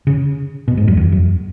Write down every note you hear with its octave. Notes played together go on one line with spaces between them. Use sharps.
C#3
B2
G#2
F#2
E2
F#2